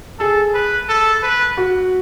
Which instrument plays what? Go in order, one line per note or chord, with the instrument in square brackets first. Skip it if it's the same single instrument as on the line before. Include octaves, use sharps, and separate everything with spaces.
[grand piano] G#4 [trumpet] A4
[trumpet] B4
A4
B4
[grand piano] F#4